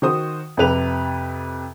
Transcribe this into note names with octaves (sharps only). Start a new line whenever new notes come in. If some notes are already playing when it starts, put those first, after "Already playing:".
D#3 F#4 C5 D#6
F2 C3 B4 F7